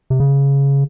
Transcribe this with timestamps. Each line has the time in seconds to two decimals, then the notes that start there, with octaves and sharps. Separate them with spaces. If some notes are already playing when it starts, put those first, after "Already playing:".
0.10 C3
0.20 C#3